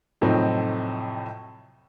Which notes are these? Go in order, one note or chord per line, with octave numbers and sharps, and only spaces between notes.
F2 A2 C3 F#3 C4 D#4